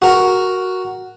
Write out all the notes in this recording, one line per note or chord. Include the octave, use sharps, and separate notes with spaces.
F#4 A#4